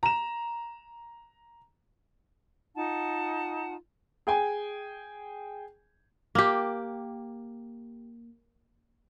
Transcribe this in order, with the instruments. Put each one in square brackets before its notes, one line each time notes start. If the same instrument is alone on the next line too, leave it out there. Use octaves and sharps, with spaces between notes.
[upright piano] A#5 E7
[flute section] D#4 F4 F#5 A5
[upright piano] G#4 G5 G#5
[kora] A#3 G4